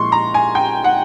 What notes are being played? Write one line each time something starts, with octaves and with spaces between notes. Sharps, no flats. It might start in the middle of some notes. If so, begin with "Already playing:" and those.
Already playing: A#2 F3 G#3 E4 C6 C#6
A#5
G#5
G5
F#5